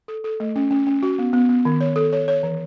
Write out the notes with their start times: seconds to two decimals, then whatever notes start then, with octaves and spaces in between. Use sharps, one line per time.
0.08 A4
0.24 A4
0.40 A3
0.56 C#4
0.71 C#4
0.87 C#4
1.03 F#4
1.19 B3
1.33 B3
1.49 B3
1.65 D#3
1.81 C#5
1.96 A4
2.13 C#5
2.28 C#5
2.43 E3